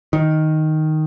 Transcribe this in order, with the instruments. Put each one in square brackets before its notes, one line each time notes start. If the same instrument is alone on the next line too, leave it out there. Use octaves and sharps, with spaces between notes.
[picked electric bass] D#3